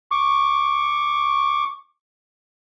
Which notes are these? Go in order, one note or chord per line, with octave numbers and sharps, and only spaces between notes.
C#6 D6